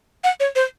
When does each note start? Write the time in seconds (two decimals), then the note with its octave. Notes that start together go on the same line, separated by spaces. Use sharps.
0.24 F#5
0.40 C#5
0.56 C5